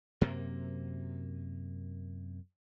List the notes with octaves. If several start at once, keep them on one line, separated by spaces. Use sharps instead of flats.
F#2 C3 A#3